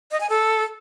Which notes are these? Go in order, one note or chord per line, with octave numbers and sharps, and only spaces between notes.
D#5
G#5
A4